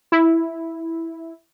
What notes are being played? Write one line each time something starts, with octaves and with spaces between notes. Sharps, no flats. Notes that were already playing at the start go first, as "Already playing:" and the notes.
E4